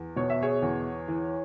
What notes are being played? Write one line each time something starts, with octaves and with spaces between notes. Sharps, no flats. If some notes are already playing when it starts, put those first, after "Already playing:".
Already playing: E2
B2 C#5
E5
G#4 C#5
E2
E3